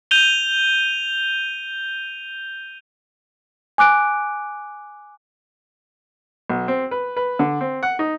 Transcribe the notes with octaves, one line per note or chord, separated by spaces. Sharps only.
G6 D#7 F7 G7
G#5 D6 F#6 D7
B1
C4
B4
B4
D3
C4
F#5
D#4